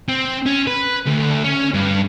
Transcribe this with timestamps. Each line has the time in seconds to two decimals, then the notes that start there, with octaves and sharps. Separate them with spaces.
0.09 C4
0.46 C#4
0.67 B4
1.06 D2
1.44 C#4
1.74 G2